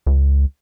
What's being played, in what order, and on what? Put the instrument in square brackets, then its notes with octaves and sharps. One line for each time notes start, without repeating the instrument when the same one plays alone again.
[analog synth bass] C#2